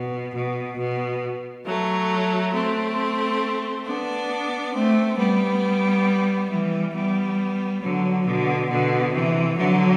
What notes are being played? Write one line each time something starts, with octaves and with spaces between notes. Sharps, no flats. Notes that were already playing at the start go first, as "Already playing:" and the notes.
Already playing: B2
B2
B2
F#3 A3
A3 C4
B3 D4
A3 C4
G3 B3
E3 G3
G3 B3
D3 F#3
B2 D3
B2 D3
C3 E3
D3 F#3